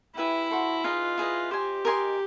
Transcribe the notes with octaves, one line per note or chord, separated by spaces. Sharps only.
E4 G4 B4 E5 G#5
F#4 A4 C5
D#4 F4 G#4 B4 D#5
E4 G#4 B4 D#5
G4 C5 D#5 G#5
A#4 D#5 G#5 C6